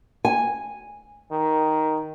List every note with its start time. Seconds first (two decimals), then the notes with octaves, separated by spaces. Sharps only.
0.25 G#5
1.31 D#3